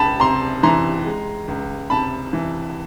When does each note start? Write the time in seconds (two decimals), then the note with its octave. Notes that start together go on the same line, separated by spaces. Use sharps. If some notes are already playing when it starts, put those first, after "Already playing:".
Already playing: C#2 A5 B5
0.20 C3 A#5 C6
0.63 E3 A#5 C6
1.05 G#3
1.48 C#2
1.90 C3 A5 B5
2.33 E3